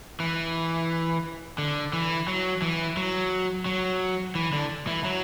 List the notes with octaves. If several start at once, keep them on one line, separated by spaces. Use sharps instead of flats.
E3
D3
E3
F#3
E3
F#3
F#3
E3
D3
E3
F#3